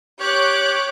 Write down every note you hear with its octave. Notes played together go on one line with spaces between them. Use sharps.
G4 C#5 D6 F#6